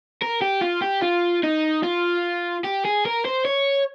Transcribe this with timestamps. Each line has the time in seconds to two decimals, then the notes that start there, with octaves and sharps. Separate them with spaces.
0.22 A#4
0.42 G4
0.62 F4
0.82 G4
1.02 F4
1.44 D#4
1.83 F4
2.64 G4
2.85 G#4
3.06 A#4
3.25 C5
3.45 C#5